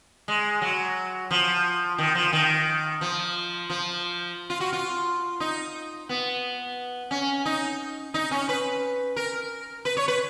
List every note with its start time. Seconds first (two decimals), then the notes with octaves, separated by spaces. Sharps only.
0.28 G#3
0.62 F#3
1.31 F3
1.98 D#3
2.15 F3
2.33 D#3
3.01 F3
3.70 F3
4.50 F4
4.60 F#4
4.73 F4
5.40 D#4
6.09 B3
7.11 C#4
7.46 D#4
8.14 D#4
8.31 C#4
8.49 B4
9.16 A#4
9.85 B4
9.97 C#5
10.08 B4